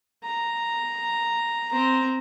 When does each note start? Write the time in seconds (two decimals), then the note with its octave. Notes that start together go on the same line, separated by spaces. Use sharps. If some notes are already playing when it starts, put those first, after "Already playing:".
0.24 A#5
1.72 C4 A#5